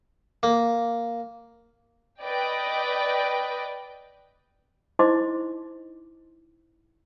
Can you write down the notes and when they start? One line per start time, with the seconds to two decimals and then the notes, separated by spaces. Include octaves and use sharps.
0.43 A#3
2.23 B4 D5 D#5 G5
4.99 D#4 E4 C5 D#5 C6 D6